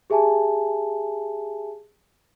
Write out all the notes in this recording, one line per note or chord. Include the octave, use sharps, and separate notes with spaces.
G4 G#4 E5 G#5 A5